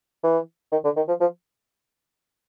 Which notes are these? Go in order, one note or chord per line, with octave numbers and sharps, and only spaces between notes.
E3
D#3
D3
D#3
F3
F3